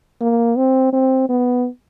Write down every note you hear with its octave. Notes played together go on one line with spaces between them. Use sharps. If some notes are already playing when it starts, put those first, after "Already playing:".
A#3
C4
C4
B3